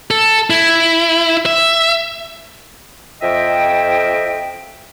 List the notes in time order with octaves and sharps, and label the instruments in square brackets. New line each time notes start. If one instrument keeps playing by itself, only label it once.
[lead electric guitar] A4
E4
E5
[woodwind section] F2 D#5 E5 G5